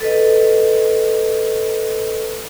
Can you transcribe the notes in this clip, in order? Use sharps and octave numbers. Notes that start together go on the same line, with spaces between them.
A4 B4 D#5